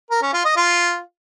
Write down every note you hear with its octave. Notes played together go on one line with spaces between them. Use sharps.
A#4
C#4
F4
D#5
F4